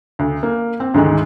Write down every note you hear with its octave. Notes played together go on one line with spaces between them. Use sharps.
D2
A#3
C4
D2 G#2 D#3 G#3